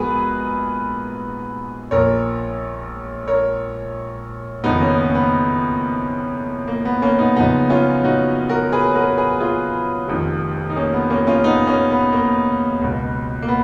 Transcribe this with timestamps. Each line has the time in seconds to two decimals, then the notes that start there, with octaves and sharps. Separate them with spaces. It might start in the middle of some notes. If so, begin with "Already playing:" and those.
Already playing: A#1 G#2 F3 B3 F#4 G#4 A#4 B4
1.91 A#1 A#2 F3 A#4 C#5
3.28 A#4 C#5
4.64 F#1 F2 D#3 B3 D#4
4.81 A#3 C#4
4.98 B3
5.10 C#4
5.15 B3
6.67 A#3
6.85 B3
7.02 A#3 C#4
7.19 B3 D#4
7.36 F#1 F#2 C#3 F3 B3 D#4
7.70 C#4 F4
8.04 D#4 F#4
8.49 F#4 A#4
8.72 G#4 B4
8.94 F#4 A#4
9.17 G#4 B4
9.40 F4 G#4
10.08 F1 F2 D#3
10.70 D#4
10.76 A#3 C#4
10.93 B3
11.10 A#3 C#4
11.27 C#4 F4
11.44 B3 D#4
11.67 A#3 C#4
11.90 B3
12.12 A#3
12.81 C#2 B2
13.42 A#3
13.48 B3